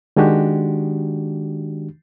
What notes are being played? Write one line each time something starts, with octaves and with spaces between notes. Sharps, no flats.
D#3 G#3 D4 F#4 G4